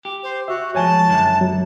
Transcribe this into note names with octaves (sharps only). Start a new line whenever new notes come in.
G4
C5
F#4 E5
G2 F3 G#3 C#5 G#5 A5
C#2 F#2 D3
F#3